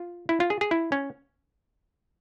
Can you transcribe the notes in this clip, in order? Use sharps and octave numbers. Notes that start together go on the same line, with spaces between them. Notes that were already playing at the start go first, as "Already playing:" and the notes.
Already playing: F4
E4
F4
G#4
G#4
E4
C#4